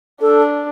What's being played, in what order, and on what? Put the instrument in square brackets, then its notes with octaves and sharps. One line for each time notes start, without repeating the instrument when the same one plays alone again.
[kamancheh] D4 [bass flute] A4